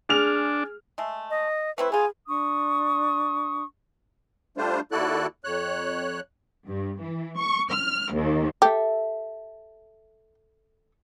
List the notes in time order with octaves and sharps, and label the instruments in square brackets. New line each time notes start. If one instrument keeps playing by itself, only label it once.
[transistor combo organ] D4 [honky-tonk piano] G#4 F6 F7
[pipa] G#3 A3
[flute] D#5
[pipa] A3 C4 E4 [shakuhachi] B4
[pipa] B3 F4 [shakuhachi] G#4 [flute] G#5
[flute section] D4 C#6 D#6
[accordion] G3 A3 D4 F4 C5
D#2 E4 F#4 A4 D5 F#6
F2 C#5 F#6
[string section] G2
E3
C#6
F6
D#2
[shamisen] G4 [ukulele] A4 E5